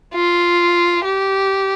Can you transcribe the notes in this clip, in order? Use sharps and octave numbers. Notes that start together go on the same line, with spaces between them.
F4
G4